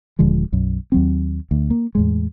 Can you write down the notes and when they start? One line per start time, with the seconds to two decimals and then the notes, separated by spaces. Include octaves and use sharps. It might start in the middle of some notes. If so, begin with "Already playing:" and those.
0.19 D#1 D3 F3 G#3
0.52 B1 F#2
0.92 D#2 F#3 C4
1.51 D2
1.70 A#3
1.95 E2 A2 G#3